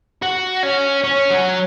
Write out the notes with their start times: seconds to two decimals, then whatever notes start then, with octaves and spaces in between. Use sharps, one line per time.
0.22 F#4
0.63 C#4
1.04 C#4
1.30 F#3